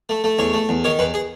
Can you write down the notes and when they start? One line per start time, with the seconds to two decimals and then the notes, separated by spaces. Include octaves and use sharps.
0.09 A3
0.24 A3
0.39 E2 C#5
0.54 A3
0.69 E2
0.84 D#3 C#5
0.99 E2 B4
1.14 G#4